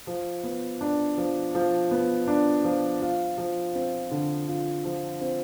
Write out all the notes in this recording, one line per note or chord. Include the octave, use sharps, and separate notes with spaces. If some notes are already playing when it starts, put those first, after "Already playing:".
F3
B3
D4
F3
F3
B3
D4
F3
F4
F3
C4
D3
F4
F3
C4